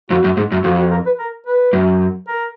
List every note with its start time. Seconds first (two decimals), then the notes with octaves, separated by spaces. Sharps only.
0.10 F2 F#4
0.24 F#2
0.37 G#2
0.52 F#2
0.64 F2 F#4
0.78 F#4
0.91 A#4
1.06 B4
1.19 A#4
1.47 B4
1.73 F#2
2.28 A#4